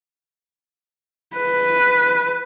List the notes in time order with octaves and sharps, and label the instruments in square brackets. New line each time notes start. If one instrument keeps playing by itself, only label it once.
[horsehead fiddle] B4